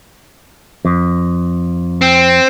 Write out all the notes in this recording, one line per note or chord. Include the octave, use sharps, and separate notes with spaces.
F2
C4